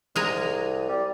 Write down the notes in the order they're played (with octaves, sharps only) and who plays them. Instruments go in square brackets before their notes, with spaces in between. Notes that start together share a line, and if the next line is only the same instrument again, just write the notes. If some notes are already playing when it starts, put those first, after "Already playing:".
[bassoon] C2 [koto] G#3 G#5 A#5
[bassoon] G3